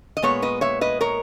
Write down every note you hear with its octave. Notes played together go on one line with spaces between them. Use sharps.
D#5
A#2 G#3 B3 C#5
B4 D#5
C#5 E5
B4 D#5
A#4 C#5